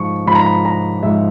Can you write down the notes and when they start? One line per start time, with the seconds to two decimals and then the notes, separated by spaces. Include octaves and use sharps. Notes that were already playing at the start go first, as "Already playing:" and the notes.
Already playing: G#2 F3 C#6
0.27 G#2 F3 B5
0.35 A#5
0.42 B5
0.65 A#5
1.03 G#2 F3 E5